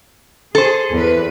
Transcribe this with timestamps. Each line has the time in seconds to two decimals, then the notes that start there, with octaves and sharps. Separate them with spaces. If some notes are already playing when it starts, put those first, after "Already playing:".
0.55 G#4 A4 C5
0.94 E2 B4